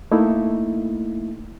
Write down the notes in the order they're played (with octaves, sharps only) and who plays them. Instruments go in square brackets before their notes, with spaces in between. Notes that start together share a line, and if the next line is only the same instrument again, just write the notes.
[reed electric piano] A3 A#3 D#4 E4